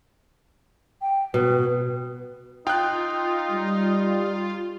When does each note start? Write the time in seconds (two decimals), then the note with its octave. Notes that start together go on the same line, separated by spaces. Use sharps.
1.01 G5
1.34 B2 B4
2.67 D#4 F4 G5 F#6
3.51 G3